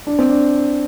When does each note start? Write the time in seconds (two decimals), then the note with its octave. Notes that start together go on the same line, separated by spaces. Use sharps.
0.07 D4
0.19 C4
0.30 D4